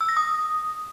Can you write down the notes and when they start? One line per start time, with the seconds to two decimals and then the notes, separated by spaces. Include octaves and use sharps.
0.01 E6
0.09 A#6
0.17 D#6